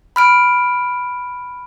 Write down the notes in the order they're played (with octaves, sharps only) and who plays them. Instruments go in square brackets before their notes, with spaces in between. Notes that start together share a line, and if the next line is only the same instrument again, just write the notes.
[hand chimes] B5 F6 D7